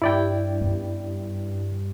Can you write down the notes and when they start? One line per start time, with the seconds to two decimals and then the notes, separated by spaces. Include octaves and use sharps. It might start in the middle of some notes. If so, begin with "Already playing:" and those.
0.02 G2 E4 D5 G5
0.61 F#2 B3